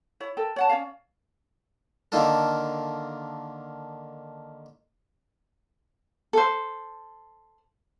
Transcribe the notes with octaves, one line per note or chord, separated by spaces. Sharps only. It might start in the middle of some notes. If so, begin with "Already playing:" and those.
E4 C#5
A4 A#4 G5
C#5 F#5 A5
C#4 C#5 D5 F5
D3 D#3 A#3 D#4 F4 A4
A4 C5